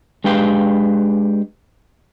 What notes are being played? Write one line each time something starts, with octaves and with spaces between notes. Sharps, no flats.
G#3 D4 G4 B4 F5 G5